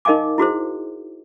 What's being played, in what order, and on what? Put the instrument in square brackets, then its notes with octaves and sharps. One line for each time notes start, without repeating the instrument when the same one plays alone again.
[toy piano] D#4 A#4 D#5 F5 G#5 D6
E4 F#4 G#4 C5